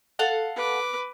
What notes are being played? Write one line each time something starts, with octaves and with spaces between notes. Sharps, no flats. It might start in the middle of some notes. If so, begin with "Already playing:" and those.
A4 F5 F#5
B4 D6